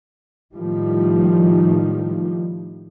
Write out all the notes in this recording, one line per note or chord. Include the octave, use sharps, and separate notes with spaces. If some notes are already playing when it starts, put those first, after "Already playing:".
A2 D#3 F3 G3